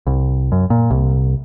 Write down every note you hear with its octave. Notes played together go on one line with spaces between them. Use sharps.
C2
F#2
A#2
C2